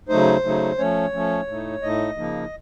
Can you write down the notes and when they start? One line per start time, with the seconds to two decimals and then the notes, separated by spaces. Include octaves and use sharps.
0.09 C#3 F#3 A3 D#4 C5
0.44 C#3 F#3 A3 D#4
0.78 F3 A3 C#4 C#5
1.13 F3 A3 C#4
1.47 A2 A3 D#4
1.82 A2 A3 D#4 D#5
2.17 C#3 F3 A#3 D#4